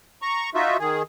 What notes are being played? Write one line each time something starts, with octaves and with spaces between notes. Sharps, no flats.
A#5 C#6
D#4 F4 F#4 E5
D#3 G#4